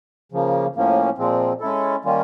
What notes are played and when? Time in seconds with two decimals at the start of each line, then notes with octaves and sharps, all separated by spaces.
0.32 C#3 F3 A#3
0.75 A2 F3 A#3 C#4
1.18 A#2 F3 G#3 C4
1.60 G#3 C#4 E4 A4
2.05 D#3 G3 A#3 C#4 F4